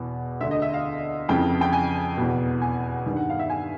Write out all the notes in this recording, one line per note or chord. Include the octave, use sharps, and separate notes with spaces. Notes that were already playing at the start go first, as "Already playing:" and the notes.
Already playing: E2 B2
D2 D3 E5
D#5
E5
F5
F2 C#3 E3 G5
G5
G#5
E2 B2
G#5
G2 D#3
F#5
F5
E5
G#5